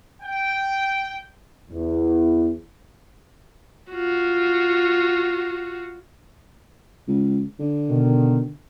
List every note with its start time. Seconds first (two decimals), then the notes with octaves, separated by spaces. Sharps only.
0.22 G5
1.70 E2
3.91 F4 F#4
7.07 C#2
7.59 D3
7.89 B2 D#3